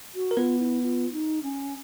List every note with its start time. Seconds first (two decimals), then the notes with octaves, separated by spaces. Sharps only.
0.15 F#4
0.31 A#4
0.37 B3 F4 B4
0.59 E4
0.83 F4
1.12 D#4
1.43 C#4